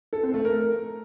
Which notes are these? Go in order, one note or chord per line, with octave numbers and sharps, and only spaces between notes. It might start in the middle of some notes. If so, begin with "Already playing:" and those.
A4
C4
A3
A#4